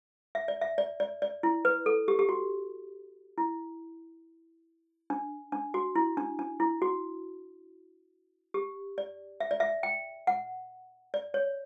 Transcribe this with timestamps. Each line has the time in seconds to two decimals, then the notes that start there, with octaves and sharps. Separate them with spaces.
0.35 E5
0.48 D5
0.61 E5
0.78 D5
1.00 D5
1.22 D5
1.43 E4
1.65 B4
1.86 A4
2.08 G4
2.19 G4
2.29 F#4
3.38 E4
5.10 D4
5.52 D4
5.74 F#4
5.96 E4
6.17 D4
6.39 D4
6.60 E4
6.82 F#4
8.54 G4
8.98 D5
9.40 E5
9.51 D5
9.60 E5
9.83 G5
10.27 F#5
11.14 D5
11.34 C#5